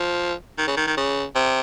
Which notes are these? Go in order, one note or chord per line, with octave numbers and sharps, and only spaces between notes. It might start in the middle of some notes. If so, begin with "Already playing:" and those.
Already playing: F3
D#3
C#3
D#3
D#3
C#3
C3